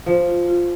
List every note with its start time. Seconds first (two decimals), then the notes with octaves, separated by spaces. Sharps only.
0.06 F3 F4
0.28 F4
0.48 F4